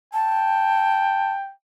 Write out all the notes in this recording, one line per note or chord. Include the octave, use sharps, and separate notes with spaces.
G5 A5